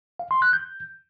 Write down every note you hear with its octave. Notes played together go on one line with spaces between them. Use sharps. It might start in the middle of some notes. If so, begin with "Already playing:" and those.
F5
C6
F#6
G6